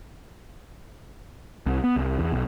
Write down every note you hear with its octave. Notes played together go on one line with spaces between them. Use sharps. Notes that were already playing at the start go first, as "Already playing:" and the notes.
C2
B3
C2
E2
B1